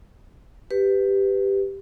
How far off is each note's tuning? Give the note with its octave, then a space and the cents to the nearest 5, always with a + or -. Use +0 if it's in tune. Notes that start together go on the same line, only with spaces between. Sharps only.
G4 +0 B4 +10